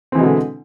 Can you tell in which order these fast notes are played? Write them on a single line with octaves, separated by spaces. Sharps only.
C4 E3 G#3 B2 D3